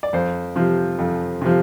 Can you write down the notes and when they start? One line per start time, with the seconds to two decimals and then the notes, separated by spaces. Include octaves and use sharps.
0.03 D5
0.13 F2 C5
0.56 C3 F3
0.99 F2
1.41 C3 F3